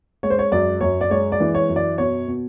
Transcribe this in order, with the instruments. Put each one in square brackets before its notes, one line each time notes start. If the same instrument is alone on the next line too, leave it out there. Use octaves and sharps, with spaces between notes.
[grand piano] G#3 C#5
C5
C#5
F#2 D5
F#2 C#5
D5
G#3 C#5
D5
E3
C#5
F#2
D5
B2 C#5
B2